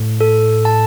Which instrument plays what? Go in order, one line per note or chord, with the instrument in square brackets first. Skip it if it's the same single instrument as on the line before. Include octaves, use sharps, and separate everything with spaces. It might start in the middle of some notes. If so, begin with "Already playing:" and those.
Already playing: [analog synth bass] A2
[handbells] A4
A5